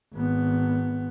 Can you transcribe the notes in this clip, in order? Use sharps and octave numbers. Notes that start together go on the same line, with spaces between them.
G#1 B3